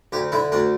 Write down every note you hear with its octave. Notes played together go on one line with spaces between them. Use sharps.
D2 G4
D3 E4
D2 D4